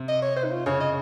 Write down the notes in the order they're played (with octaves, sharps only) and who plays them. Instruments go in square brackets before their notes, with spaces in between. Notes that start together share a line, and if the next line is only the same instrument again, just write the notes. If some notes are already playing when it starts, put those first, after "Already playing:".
Already playing: [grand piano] C3
[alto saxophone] D#5
C#5
C5
D#4
F4
[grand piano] C#3 [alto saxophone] C#5
[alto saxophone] D#5